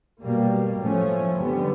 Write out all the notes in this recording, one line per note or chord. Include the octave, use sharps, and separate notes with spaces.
B2 G3 A#3
A2 F3 A3 C#4
D3 G3 B3